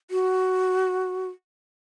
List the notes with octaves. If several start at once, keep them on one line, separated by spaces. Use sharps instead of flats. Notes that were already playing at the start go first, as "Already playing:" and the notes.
F#4